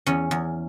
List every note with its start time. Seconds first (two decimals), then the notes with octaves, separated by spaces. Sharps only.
0.06 E2 C#4
0.31 E2